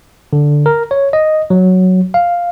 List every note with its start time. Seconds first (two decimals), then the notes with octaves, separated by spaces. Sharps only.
0.33 D3
0.66 A#4
0.91 C#5
1.13 D#5
1.50 F#3
2.14 F5